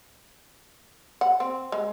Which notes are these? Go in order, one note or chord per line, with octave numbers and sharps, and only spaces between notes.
F#5
C4
G#3